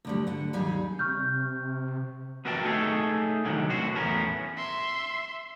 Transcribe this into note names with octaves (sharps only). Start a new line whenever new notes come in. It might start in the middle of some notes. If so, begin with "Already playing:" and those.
D2 D3 G3
D3 F#5
D#2 G3 D#4 G#4
C3 C#6 F6 G6
B3 F#4 A#4 E5 G5 A5
A3 D#4 E4 G#4 A4 C#5
C2 A2 D3 D#3 F#3
A2 F#4 C5
E2 A2 B3 C#4 A#4
E5 C6